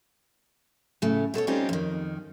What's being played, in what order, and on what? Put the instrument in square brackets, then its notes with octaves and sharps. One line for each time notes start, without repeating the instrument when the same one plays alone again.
[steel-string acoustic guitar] A2 C#3 A3
B2 A4 C5 C#5
G3 C4 C#4 D#4 F4 G4
F2 D#3